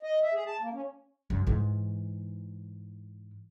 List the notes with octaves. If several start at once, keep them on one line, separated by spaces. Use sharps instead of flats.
D#5
E5
G#4
A5
A#3
C#4
F#2
G#2 E3